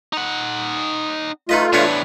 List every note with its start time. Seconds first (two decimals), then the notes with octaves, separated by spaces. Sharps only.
0.13 D#4 F#5
1.49 A3 D#4 F4 B4 D#5
1.73 E2 A2 D4 B4 C#5